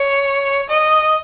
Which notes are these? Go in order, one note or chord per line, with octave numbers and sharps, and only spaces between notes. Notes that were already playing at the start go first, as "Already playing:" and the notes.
Already playing: C#5
D#5